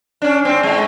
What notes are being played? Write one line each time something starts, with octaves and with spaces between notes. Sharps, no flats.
C#4 D4
G#2 C4
G#2 G#3